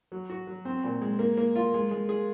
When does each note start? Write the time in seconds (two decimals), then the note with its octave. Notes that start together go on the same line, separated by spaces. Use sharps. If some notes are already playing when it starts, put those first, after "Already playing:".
0.12 F#3
0.30 F#4
0.47 F#3
0.65 C4
0.84 A#2
1.02 G#3
1.19 A#3
1.37 A#3
1.55 F4
1.74 G#3
1.91 G#3
2.09 G#4